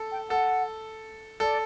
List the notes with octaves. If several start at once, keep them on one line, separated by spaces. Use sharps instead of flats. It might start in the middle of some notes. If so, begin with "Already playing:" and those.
Already playing: A4
G5
A4 F#5
A4 D5